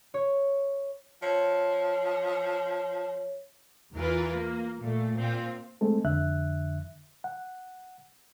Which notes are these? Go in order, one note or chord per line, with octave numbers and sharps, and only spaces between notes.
C#5
F3 C#5
E2 E3 F4 A#4 B4
A#3
A#2 A3
A#2 C4 F4
G#3 A3 C4 A4
F2 D3 E5 F#6
F#5